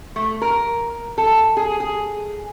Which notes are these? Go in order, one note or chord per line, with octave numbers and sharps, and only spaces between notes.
A3
A#4
A4
G#4
G#4